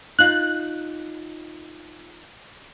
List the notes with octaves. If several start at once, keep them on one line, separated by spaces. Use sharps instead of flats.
D#4 F4 F#6